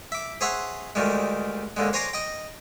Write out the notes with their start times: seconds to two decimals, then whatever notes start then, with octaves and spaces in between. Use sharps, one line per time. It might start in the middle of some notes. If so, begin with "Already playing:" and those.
0.12 E5 D6
0.41 G#4 C5 C#5 E5 F#5
0.95 D2 D#3 G3 G#3
1.77 D#2 D3 G#3
1.93 C5 C#5 G#5 A#5 C6 D6
2.13 D#5 G5